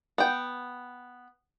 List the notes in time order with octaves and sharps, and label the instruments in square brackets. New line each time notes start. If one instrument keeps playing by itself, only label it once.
[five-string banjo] B3 G5